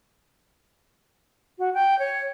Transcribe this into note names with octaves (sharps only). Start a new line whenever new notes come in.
F#4
G5
C#5